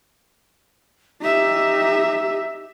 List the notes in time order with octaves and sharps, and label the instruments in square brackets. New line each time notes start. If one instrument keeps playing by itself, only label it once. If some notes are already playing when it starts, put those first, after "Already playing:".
[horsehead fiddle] D#4 E5 [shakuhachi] G4